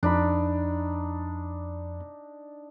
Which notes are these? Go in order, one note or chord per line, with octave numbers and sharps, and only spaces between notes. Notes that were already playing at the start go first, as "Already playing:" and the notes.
F2 D4 D#4 B5